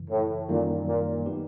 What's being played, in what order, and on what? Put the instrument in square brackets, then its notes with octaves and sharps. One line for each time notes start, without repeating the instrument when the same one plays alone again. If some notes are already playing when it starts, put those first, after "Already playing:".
Already playing: [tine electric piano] F#2 C#3 E3
[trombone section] A2
[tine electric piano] F#2 D#3 G3 A#3 D#4 [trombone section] A#2
[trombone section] A#2
[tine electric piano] F#3 B3 D#4 G4 B4